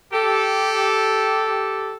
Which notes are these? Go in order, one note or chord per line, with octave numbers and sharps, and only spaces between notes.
G4 A4